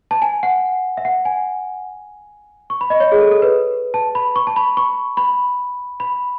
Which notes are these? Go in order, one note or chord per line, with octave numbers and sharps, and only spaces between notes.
A5
G#5
F#5
E5
F#5
G#5
C#6
B5
D#5
C#5
G#4
A4
A4
B4
A5
B5
C#6
A5
B5
C#6
B5
B5